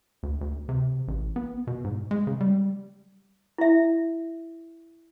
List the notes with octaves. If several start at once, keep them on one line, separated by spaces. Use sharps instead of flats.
D2
D2
C3
A1
B3
B2
G#2
G#3
C#3
G3
E4 E5